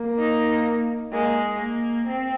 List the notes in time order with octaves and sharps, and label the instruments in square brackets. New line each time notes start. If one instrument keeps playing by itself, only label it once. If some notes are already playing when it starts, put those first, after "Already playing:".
Already playing: [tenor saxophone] A#3
[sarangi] D#4
[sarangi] G#3 [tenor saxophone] A#3
[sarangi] A#3
C4